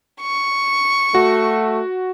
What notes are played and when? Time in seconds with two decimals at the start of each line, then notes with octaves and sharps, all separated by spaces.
0.22 C#6
1.15 A3 F#4